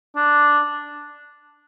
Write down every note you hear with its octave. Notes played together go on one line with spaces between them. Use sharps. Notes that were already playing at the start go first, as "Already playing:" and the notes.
D4